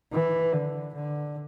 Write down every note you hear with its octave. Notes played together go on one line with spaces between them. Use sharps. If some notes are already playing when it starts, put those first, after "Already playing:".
E3
D3
D3